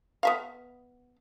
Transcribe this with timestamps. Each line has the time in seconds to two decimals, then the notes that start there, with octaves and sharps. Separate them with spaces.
0.23 B3 E5 F5